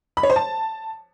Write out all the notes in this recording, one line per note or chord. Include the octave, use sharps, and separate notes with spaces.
B5
C#5
C5
A5